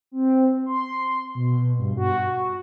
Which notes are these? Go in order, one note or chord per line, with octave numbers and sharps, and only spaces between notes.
C4
C6
B2
G2
F#4